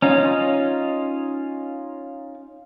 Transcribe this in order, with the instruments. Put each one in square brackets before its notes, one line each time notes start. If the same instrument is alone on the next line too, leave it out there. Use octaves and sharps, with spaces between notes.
[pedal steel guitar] C#4 D#4 F4